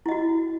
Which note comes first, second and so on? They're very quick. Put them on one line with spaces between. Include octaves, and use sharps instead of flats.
E4 D#5 F#4